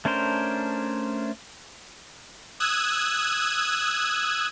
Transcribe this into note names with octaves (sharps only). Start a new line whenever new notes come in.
A3 C#4 D4 A#4 C5
D#6 E6 F#6 G#6